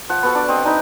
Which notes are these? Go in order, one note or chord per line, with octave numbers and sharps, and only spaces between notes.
F3 F#5
B3 F#4 A4
D4 D5
C4 D#5
D4 D#4 B4